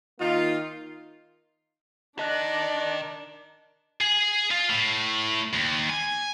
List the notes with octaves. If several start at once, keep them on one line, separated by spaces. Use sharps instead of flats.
D#3 A#3 D#4 F4
D4 A#4 D5 D#5 A5 F#6 A#6
G#4
F4
A2
D#2
G#5